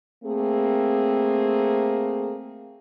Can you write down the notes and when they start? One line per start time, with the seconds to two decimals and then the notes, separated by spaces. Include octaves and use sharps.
0.24 A3 A#3 C4 G#4